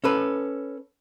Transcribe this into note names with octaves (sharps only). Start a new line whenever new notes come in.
C#4 A4 B4